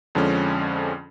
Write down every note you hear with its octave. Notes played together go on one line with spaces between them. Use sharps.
F2 D3 F3 G#3 C#4